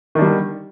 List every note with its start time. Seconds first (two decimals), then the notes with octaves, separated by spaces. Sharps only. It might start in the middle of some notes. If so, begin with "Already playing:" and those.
0.15 D#3
0.19 D4
0.22 G3
0.25 D3